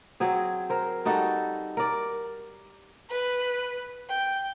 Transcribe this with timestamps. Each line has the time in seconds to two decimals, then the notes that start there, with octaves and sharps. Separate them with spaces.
0.20 F#3 C4 G#4
0.70 A#4 C5
1.05 G3 D#4 F#4 A4
1.77 A#4 D5
3.10 B4
4.10 G5